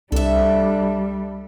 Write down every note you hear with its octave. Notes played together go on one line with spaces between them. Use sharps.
C2 G3 D4 A4 E5